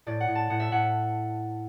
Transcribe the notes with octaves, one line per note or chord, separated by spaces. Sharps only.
A2 D5
F#5
A2
A5
A2 F#5
E5
A2 F#5